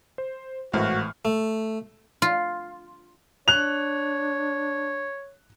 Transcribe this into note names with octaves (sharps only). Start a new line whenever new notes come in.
C5
G#1 A2 E3 F#4 F6
A3
F4
D4 C#5 F#6 F7